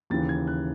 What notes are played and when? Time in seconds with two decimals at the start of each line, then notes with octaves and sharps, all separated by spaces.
0.10 D#2 C#3 E3 A6
0.29 G#6
0.47 F#6